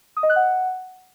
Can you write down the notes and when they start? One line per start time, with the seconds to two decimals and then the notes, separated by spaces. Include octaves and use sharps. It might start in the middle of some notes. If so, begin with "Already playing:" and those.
0.17 D#6
0.23 D#5
0.30 F#6
0.36 F#5